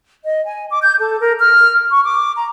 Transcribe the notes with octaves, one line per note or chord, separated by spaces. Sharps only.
D#5
G#5
D6
G6
A4
A#4
F6
C#6
D6
A#5